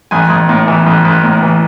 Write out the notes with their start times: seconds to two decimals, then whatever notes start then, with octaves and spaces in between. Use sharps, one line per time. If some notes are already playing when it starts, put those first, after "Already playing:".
0.11 A1 G#5
0.30 A1
0.49 A2
0.67 E3
0.86 A1
1.05 A1
1.24 A2
1.42 E3